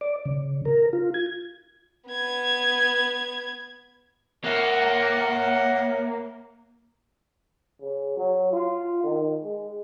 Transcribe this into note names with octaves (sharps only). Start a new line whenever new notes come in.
D5
C#3
A#4
F4
G#6
B3 G#6
A#3 C#5 E5 F#5
C#3
F#3
F4
D#3
G#3